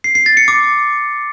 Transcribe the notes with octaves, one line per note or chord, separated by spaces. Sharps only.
C7
C7
A6
C#7
D6